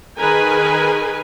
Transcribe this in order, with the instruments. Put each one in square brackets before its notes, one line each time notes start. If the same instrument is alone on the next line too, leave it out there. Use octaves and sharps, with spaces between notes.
[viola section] D#3 G#4 A#4 B4 G#5